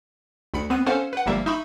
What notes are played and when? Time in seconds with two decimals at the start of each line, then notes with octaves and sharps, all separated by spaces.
0.54 D2 B5 C#7
0.70 B3 C4 D#7
0.86 C#4 A4 C5 F5 F#5 G#5
1.13 B4 F#5
1.26 G1 F3 G3 A#3 E5
1.46 D#4 E5 B5 C#6